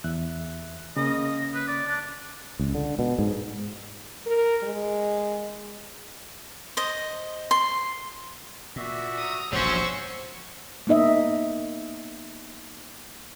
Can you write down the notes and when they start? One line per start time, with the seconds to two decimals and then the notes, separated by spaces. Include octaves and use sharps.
0.04 E2 E5 F#6
0.97 C#3 A#3 C#4 D#5
1.54 B4
1.67 D5
1.86 D4
2.59 C#2
2.75 D3
2.99 B2
3.19 G#2
4.26 A#4
4.63 G#3
6.77 C5 D#5
7.51 C6
8.76 A#2 F#4 D5 E5
9.18 A#5 D#6
9.53 E1 A#1 G2 F#3 C#4 C5 C#6 E6
10.87 A#3 B3 D#4 D#5 E5